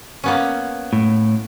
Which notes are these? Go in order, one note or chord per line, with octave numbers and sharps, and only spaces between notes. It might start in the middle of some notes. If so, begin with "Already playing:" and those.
A#3 B3 C#4
A2